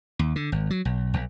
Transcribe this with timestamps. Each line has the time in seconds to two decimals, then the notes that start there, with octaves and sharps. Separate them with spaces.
0.19 D#2
0.36 D3
0.52 G#1
0.70 F#3
0.85 B1
1.14 B1